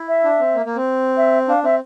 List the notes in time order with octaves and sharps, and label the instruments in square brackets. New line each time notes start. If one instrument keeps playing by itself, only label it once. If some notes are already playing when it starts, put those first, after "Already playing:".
Already playing: [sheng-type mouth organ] E4
[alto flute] E5
[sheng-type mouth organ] D4
C4
A#3
A#3
C4
[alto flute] E5
[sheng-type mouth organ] D4 [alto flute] F5
[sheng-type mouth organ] C4 [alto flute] E5